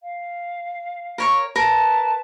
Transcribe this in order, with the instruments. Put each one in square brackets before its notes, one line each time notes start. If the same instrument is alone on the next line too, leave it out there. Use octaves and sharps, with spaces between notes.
[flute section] F5
[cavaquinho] A#4 C#5 C#6
[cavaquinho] A#4 [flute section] B4 A5